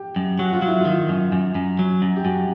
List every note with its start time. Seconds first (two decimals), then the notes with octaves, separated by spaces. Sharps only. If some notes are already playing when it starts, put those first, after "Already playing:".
Already playing: G4
0.16 F#2
0.39 F#3 F#4
0.53 F4
0.62 F#3
0.67 E4
0.81 D#3 F4
1.09 F#2
1.32 F#2
1.55 F#2
1.79 F#3
2.02 F#2
2.16 G4
2.25 F#2 F#4